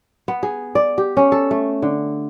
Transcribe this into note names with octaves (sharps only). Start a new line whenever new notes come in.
B3
G#4
D5
G4
C#4
A4
A3
D3